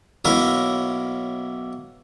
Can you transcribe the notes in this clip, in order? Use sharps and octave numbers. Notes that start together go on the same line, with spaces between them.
B1 A#3 C#4 E4 A#4